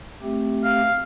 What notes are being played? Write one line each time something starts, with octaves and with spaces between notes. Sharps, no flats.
A3 C4 G4
F5